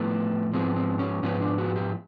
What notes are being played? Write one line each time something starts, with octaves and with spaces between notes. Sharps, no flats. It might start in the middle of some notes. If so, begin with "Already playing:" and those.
Already playing: A2 F3 A3 B3
G#2 F3 G#3 B3 C4
C4
C#4
G#2 F3 G#3 B3 C#4
D4
F#4
G4